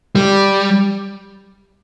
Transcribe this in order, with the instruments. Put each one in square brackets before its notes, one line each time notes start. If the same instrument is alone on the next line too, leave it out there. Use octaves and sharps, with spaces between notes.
[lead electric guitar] G3